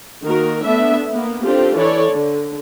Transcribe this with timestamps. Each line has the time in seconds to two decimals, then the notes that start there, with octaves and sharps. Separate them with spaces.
0.25 D#3 A#3 F#4 A#4
0.64 A3 B3 D4 E5
1.12 A#3 B3
1.44 C4 D4 F4 G4 A4
1.76 E3 A4 C#5 D5
2.11 D3